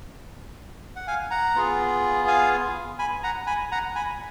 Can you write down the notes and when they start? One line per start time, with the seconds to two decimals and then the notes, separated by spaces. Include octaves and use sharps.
0.96 F#5
1.07 F5 G#5
1.31 F#5 A#5
1.56 B3 F4 G#4
2.28 F5 G#5
2.99 G#5 B5
3.23 F#5 A#5
3.47 G#5 B5
3.71 F#5 A#5
3.95 G#5 B5